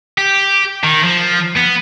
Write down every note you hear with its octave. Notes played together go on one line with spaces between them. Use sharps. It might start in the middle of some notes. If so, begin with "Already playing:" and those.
G4
D#3
F3
B3